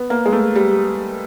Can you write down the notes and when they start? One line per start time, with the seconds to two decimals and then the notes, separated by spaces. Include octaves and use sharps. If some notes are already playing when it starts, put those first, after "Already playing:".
Already playing: B3
0.10 A#3
0.26 G#3
0.32 A3
0.55 G3